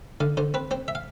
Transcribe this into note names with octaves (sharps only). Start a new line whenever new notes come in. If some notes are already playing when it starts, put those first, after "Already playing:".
D3 F5
D3 C5
C4 B4
C4 C5
E5
F5